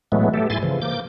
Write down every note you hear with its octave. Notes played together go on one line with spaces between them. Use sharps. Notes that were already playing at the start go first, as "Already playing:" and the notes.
A2 E3 F#3 G#3 A3 B3
A3 G4 A4
G#2 E4 G#5 C6 A6
C#3 E3 F3
A#3 D6 G6